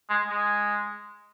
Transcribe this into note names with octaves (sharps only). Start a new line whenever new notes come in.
G#3
G#3